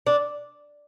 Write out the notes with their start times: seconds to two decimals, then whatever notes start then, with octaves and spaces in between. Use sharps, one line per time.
0.07 D4